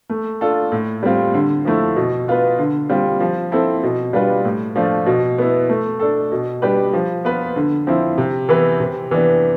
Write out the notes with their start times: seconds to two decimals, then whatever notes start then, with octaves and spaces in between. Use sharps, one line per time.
0.10 A3
0.41 D4 F4 A4
0.72 A2
1.03 G3 C4 F4
1.34 D3
1.65 F3 A3 E4
1.96 B2
2.28 B3 F4 B4
2.58 D3
2.90 G3 C4 F4
3.20 F3
3.52 C4 E4 A4
3.83 B2
4.13 G3 D4 F4 B4
4.45 A2
4.76 F3 A3 D4 F4
5.06 B2
5.38 B3 E4
5.69 A3
6.00 D4 A4
6.32 B2
6.62 G3 D4 G4 B4
6.93 F3
7.25 B3 F4 B4
7.56 D3
7.87 F3 C4 E4
8.18 C3
8.49 E3 B3 E4 B4
8.80 C3
9.11 E3 B3 D4